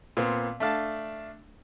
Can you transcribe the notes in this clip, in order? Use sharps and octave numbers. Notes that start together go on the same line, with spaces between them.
A#2 B3 C4
A3 D4 F5 A5